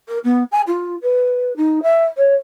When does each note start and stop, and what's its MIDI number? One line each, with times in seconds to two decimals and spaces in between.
0.08 0.18 70
0.24 0.43 59
0.52 0.61 80
0.67 0.96 65
1.02 1.56 71
1.56 1.83 63
1.83 2.04 76
2.17 2.34 73